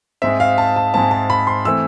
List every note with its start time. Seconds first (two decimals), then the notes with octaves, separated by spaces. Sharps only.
0.22 G#2 G#3 C4 E5
0.40 F5
0.58 A5
0.76 A5
0.94 G#2 G#3 C4 A5
1.11 A5
1.30 B5
1.47 C6
1.65 E3 A3 C4 E6